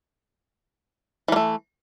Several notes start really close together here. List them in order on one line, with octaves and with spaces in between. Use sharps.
E3 A#3 A3